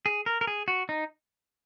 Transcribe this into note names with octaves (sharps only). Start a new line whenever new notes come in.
G#4
A#4
A#4
G#4
F#4
D#4